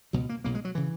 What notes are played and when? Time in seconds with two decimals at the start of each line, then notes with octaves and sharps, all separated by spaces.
0.13 C#2 B2 F#3
0.29 A#3
0.44 B1 B2 A#3
0.55 G#3
0.65 F#3
0.75 C#3 E3